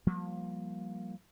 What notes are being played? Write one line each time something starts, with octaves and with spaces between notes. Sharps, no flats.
F3 G3 A#3